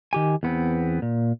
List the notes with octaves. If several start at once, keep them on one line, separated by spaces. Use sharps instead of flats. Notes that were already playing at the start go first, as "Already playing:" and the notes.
D#3 G4 G#5
E2 B3 C4
A#2